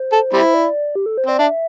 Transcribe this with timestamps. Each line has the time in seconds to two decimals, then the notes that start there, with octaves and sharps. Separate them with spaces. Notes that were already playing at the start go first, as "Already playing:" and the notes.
Already playing: C5
0.13 A4
0.33 G3 C4 E4
0.54 D5
0.95 G4
1.06 A4
1.18 C5
1.26 C4 D5
1.39 D4 E5